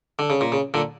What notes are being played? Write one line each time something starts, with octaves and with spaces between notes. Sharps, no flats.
D3
C#3
A#2
C#3
A#2 D3